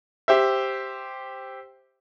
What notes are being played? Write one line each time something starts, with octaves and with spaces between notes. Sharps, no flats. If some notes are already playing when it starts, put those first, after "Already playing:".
G4 C5 E5